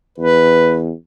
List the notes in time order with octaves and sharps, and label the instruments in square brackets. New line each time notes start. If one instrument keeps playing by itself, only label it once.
[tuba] E2 [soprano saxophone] B4